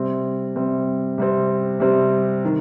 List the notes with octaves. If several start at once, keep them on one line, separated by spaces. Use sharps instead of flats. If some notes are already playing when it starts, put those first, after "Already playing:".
Already playing: C3 G3 C4
C3 G3 C4
C3 G3 C4
C3 G3 C4
D#3